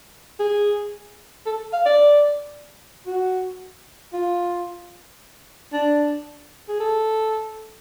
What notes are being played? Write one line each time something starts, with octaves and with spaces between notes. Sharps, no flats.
G#4
A4
F5
D5
F#4
F4
D4
G#4
A4